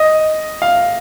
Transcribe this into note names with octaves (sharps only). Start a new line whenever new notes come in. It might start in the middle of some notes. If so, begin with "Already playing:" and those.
Already playing: D#5
F5